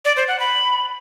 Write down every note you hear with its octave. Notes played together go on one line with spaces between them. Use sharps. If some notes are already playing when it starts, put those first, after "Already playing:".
D5
C5
F#5
B5